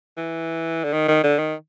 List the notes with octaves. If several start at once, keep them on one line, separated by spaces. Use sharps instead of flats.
E3
D3
D#3
D#3
D3
D#3